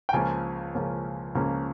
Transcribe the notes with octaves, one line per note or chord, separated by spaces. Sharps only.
G5
C#2 C#3 F3 A#3 C#4 G#5
C#2 C#3 F3 A#3 C#4
C#2 C#3 F3 A#3 C#4